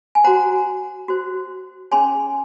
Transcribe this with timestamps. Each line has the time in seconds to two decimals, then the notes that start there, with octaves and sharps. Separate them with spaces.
0.15 G#5
0.24 F#4 C5 F#5 A#5
1.08 F#4 C5
1.91 C#4 G#4 C#5 G#5 C6